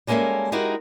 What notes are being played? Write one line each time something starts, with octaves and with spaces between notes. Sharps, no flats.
G3 G#3 A#3 C#4 A4 E5
G#3 D#4 E4 F#4 G4 A#4